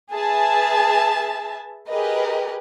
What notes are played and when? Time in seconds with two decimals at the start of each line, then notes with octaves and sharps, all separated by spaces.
0.13 G#4 B4 E5 A5
1.88 G4 G#4 A#4 B4 D#5